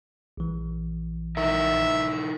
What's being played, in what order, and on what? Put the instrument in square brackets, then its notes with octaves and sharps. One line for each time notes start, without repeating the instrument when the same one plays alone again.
[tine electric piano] A#1 E3
[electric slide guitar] D#4 E4 A#4 [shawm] E5